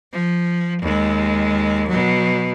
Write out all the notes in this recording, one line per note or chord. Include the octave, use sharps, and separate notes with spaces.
F3
D#2 G#3
B2 F#3